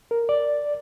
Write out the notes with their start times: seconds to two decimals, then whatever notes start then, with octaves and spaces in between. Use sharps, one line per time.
0.11 A#4
0.29 D5